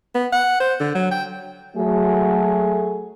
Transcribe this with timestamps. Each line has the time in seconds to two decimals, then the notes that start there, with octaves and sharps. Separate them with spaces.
0.15 B3
0.32 F#5
0.60 C5
0.80 D3
0.95 F#3
1.11 G5
1.77 F#3 A3 G#4